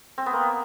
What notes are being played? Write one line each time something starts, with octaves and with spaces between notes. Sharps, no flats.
C4
B3
A#3